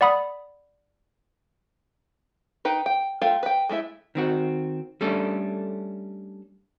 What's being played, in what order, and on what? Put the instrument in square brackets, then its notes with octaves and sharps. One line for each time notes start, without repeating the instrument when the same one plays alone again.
[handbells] D5 F#5 B5 D#6
[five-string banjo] D#4 B4 G5
G5
A3 F4 F5 G5
B4 G5
G#3 A3 E4 E5
[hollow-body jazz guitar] D#3 C4 F#4
G3 A3 C#4 D4 A4